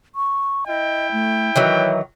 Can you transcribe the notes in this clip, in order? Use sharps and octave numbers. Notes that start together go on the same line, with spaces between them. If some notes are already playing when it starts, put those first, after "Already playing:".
C#6
E4 D#5 G5
A3
D#3 E3 F#3 E5